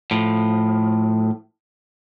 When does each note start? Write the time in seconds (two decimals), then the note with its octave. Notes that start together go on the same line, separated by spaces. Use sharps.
0.11 A2 F3